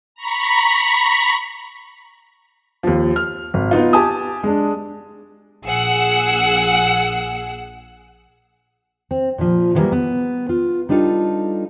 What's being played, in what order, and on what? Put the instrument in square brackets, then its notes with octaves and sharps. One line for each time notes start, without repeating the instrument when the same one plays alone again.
[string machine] A#5 B5 C#6 B6
[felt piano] D#2 F3
F6
G#1
B3 D#4 F4
G4 G#5 A5 D#6
G#3 D4
[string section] A#1 G#4 F#5 E6
[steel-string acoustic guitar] C4
A#2 F3
D3 E3 F#3 G3 A#3
B3
F4
G3 D4 D#4 F4 A4